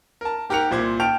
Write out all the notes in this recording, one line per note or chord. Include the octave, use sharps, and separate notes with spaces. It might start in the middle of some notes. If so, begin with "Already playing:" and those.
A#4 A5
G#2 G4 A#4 F#6 C#7 F7
C2 A#2 C5 D6 G#6
G5 A5 F6 G6 D7 F7